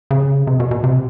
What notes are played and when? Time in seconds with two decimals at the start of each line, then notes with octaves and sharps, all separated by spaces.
0.11 C#3
0.47 C3
0.60 B2
0.71 B2
0.84 C3